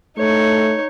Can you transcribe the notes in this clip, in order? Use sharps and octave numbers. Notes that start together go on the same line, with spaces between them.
A3 D#4 C#5